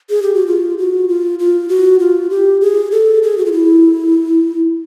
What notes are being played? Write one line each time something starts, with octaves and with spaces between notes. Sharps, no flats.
G#4
G4
F#4
F4
F#4
F4
F4
F#4
F4
G4
G#4
A4
G#4
F#4
F4
E4